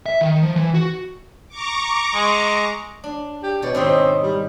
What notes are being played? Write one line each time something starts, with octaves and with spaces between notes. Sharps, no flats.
E5
D#3
F3
E3
F#4
A#5 C#6 D6
G#3
D4
G4
B2 C#5 D5
G#2 B2 D#3 C4
G3